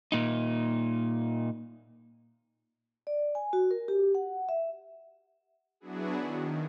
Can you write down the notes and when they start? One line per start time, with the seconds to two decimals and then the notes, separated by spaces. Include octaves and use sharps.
0.12 A#2 D#4
3.07 D5
3.35 G#5
3.53 F#4
3.71 A#4
3.88 G4
4.15 F#5
4.49 E5
5.80 F#3 B3 D4 E4 F#4 G#4
6.17 D#3